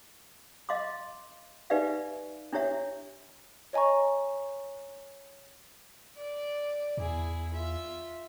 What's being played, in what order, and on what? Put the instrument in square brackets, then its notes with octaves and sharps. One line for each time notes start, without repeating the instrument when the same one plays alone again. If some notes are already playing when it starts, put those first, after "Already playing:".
[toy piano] D#5 F5 C6 D6
D#4 G4 B4 D5 E5 F5
D4 E4 G4 C#5 E5
[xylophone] C#5 D#5 G#5 A#5 C#6
[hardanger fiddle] D5
[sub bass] E2 [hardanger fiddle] E4 G#4
[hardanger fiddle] F4 E5